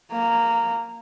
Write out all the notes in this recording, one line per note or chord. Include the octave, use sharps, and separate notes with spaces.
A#3 A#5